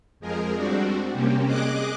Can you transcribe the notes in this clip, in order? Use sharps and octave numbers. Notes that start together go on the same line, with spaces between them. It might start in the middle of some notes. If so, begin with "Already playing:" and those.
F2 F3 G#3 G#4 A#4
G3 C4 D4 F#4
C3 G3 A#3 C4 C#4
G#4 D#5 D6 F#6